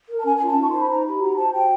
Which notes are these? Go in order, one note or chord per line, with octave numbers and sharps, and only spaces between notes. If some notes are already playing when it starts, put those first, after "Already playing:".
A#4
A5
C#4 G#5
G#5
F4
A5
D#4 C#6
C5 C6
B5
D#4 A#5
G4 B5
F#4 A#5
C5 A5
F#4 G5